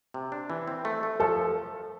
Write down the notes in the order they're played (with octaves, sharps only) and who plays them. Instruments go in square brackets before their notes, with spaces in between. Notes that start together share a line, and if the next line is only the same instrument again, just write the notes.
[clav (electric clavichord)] C3
D4
E3
C4
A3
A3
[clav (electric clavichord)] F3 [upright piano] A4